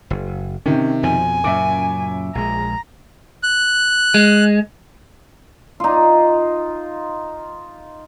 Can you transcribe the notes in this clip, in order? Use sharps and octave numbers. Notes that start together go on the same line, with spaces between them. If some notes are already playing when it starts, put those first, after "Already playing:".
F#1
C3 D#3 C#4
F2 B2 F3 G#5
F#2 A#2 C#3 E5 D6
A#1 G#3 A#5
F#6
G#3
D#4 F4